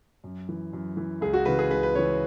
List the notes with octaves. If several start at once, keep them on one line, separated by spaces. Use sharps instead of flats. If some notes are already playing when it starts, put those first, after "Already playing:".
F#2
E3
F#2
E3
C#2 G#4
F#4
C#3 E3 B4
G#4
C#2 B4
B4
C#3 E3 C#5